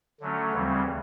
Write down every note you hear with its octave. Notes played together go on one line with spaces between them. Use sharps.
D3 F#3 A3 C#4
D2 C#3 E3 G3 C4